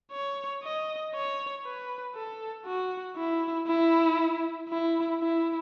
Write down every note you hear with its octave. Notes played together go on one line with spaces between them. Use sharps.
C#5
D#5
C#5
B4
A4
F#4
E4
E4
E4
E4